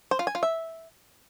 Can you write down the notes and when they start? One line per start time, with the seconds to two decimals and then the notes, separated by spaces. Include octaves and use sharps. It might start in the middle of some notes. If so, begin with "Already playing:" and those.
0.11 C5
0.19 F4
0.27 G#5
0.35 F4
0.43 E5